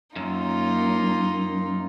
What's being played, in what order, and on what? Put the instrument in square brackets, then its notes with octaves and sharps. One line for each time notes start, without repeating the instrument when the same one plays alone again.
[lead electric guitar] F#2 [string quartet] A#3 D#4 F4